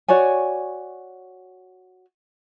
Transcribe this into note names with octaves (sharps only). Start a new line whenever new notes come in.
F#4 C#5 D5 G#5